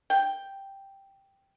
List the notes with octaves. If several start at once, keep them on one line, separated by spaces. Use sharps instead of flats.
G5